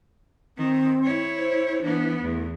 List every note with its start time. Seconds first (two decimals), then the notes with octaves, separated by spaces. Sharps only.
0.58 D#3 C4
1.04 E4 C#5
1.38 C5
1.82 E3 B3 D4
2.22 E2 A3